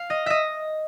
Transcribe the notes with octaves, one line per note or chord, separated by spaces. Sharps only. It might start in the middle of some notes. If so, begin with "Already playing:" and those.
Already playing: F5
D#5
D#5 E5